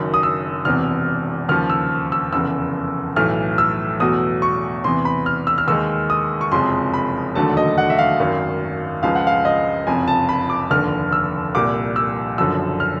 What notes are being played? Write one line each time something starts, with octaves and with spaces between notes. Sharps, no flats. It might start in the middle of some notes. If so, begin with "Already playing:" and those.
Already playing: F#1 F#2 D#3
D#6
E6
E1 E2 C3 F6
D#2 C#3 F3 F6
E6
E6
F1 E2 C#3 E6
B1 A2 E3 A3 F6
E6
E2 B2 F#3 A3 D#6
C#6
E2 C3 E3 C6
B5
F6
E6
F6
D#2 D#3 G#3 E6
D#6
C#6
F#1 F2 C3 F3 G#3 C6
B5
E1 D#2 D3 F#3 A3 A5
D#5
F#5
E5
F5
G#1 F#2 D#3
C#2 C#3 F3 G#3 F5
F#5
F5
D#5
F#1 F2 C3 G#5
A5
B5
D6
F1 D#2 D3 F6
E6
C2 A#2 G3 D6
E6
F#1 F#2 D3 F3 E6
F6